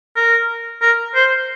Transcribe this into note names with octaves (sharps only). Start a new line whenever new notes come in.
A#4
A#4
C5